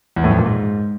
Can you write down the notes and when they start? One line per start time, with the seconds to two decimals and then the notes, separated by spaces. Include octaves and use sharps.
0.16 E2
0.24 A2
0.31 F2
0.38 A#2
0.46 G#2